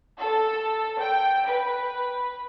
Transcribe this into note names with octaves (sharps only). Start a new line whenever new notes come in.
A4
G5
B4